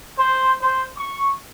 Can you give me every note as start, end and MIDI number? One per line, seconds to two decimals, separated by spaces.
0.18 0.52 72
0.61 0.83 72
0.97 1.31 85